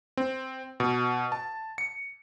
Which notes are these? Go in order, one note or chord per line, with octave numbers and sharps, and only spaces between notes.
C4
B2
A5
C#7